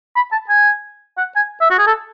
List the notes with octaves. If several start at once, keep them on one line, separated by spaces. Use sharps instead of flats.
B5
A5
G#5
F#5
G#5
E5
F#4
G#4
A4